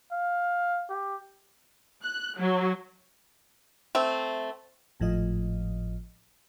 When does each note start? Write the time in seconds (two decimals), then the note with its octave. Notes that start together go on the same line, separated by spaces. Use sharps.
0.12 F5
0.90 G4
2.03 F#6
2.39 F#3
3.95 A3 C4 E5
5.00 G#1 A2 F3 F4 D#5